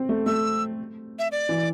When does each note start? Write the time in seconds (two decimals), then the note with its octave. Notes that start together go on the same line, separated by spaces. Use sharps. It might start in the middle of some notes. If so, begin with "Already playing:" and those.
Already playing: C4
0.09 A3
0.26 A3 E6
1.19 E5
1.32 D5
1.49 E3